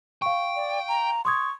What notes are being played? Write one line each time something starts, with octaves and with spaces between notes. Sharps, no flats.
F5 G5 C#6
D5
A#5
C6 C#6 D#6 G#6